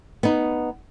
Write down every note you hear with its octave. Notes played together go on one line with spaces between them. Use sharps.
B3 D#4